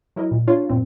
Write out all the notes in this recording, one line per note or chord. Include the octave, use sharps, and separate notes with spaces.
F#3 E4 A#4 D#5
A#2
D4 F4 C#5
F#2 A#2 C4